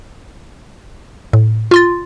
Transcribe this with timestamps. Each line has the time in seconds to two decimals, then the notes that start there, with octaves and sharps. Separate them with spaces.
1.33 A2
1.71 F4 C6 A6